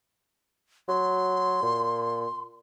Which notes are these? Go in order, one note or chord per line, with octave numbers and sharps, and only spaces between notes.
F#3 C6
A#2